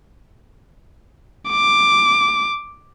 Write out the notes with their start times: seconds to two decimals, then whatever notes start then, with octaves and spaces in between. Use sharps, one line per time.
1.50 D6